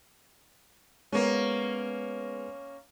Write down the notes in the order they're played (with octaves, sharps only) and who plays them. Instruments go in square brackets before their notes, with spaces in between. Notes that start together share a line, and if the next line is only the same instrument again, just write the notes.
[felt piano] G#3 B3 [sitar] A#3 C#4